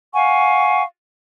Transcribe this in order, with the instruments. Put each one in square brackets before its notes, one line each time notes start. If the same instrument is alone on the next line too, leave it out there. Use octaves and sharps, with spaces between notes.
[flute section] F5 F#5 G#5 C#6